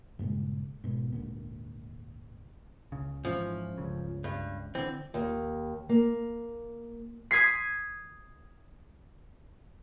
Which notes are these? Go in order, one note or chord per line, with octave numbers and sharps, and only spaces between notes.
G2 A#2 C#3 G#3
G#2 B2
G#1 D2 A#2
C#2 C#3
G#2 E3 F3 C#4
G1 C#2 C#3
G2
D3 E3 C4
D#2
A#3
D#6 G#6 B6 C7